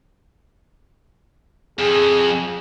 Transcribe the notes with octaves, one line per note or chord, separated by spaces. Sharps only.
F2 G#4